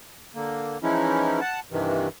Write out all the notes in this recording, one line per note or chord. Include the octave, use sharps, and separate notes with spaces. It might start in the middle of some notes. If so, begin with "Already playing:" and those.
D3 A#3
E3 F3 G#3 C#4 D#4 E4
F#5 A5
G2 C3 D#3 E3